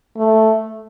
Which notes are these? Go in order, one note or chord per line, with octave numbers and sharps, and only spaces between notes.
A3